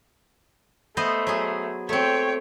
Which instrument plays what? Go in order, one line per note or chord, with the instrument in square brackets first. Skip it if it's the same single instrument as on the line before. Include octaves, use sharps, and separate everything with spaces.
[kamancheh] A3 [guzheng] B3 C5 D#5
[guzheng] F#3 G#4
[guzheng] A3 C4 [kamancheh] C#5 G5